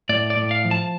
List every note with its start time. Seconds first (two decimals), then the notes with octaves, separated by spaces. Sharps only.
0.09 A2 D5
0.30 D5
0.37 A2
0.51 F5
0.65 F3
0.71 A5